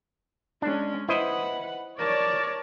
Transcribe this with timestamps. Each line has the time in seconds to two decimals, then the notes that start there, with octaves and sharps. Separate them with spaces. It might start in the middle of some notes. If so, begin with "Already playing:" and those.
0.62 G#3 C#4 D4
1.09 E4 B4 C5 D#5 F#5
1.99 A#4 C#5 D5 A5